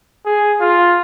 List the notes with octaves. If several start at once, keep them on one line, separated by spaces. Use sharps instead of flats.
G#4
F4